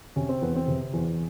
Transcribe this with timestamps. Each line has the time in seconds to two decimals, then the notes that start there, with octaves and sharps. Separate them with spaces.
0.16 C3 C#4
0.29 C4
0.42 E2 B3
0.55 C4
0.68 C3
0.93 E2